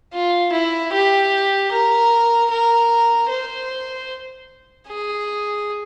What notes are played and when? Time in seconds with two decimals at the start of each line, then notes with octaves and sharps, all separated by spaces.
0.14 F4
0.52 E4
0.93 G4
1.72 A#4
2.51 A#4
3.30 C5
4.88 G#4